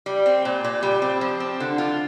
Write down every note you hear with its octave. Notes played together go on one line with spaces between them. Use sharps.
G3
C4
A#2
A#2
G3
C4
F3
C4
D3
F4